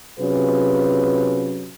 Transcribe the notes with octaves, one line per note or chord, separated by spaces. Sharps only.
C3 F#3 C#4 F4 G#4 B4